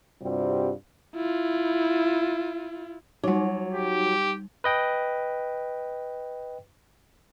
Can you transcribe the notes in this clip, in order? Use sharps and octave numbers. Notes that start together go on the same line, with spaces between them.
G2 C3 G3 C4 F4 F#4
E4 F4
F#3 G3 D#4 F#4
G4
B4 D#5 G5